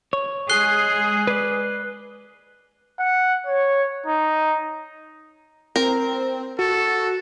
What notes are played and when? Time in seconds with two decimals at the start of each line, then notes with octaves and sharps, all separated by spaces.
0.13 C#5
0.50 G#3 G#4 F#6 C7 G7
1.27 B4 D5
3.00 F#5
3.47 C#5
4.07 D#4
5.76 C4 A#4
6.59 F#4 A4